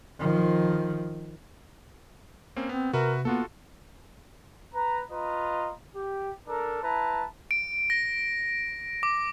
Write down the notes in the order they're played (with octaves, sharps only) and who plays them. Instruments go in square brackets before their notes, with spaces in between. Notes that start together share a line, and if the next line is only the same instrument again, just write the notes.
[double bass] D#3 F3
[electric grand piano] A#3 C4 C#4
[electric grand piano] B3 [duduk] C4
[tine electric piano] C3 [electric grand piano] F#4 B4 E5 [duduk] A#4
[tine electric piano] A#3 [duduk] B3 [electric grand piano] F4 F#4 A4
[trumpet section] B4 A#5
F4 B4 D#5 A#5
G4
D4 A4 A#4
E4 B4 A5 A#5
[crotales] D7
A#6
D6